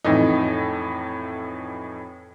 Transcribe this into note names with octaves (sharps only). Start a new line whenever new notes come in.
F2 A2 E3 D#4